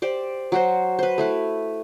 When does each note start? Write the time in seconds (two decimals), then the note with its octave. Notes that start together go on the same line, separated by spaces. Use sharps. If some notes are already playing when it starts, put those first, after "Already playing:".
0.02 G4 C5 D5
0.52 F#3 F#4 C5
0.99 B4 C5
1.18 A3 E4 B4